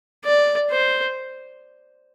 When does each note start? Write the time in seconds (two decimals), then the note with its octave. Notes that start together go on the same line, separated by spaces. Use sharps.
0.24 D5
0.70 C5